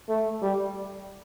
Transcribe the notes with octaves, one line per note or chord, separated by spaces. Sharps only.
A3
G3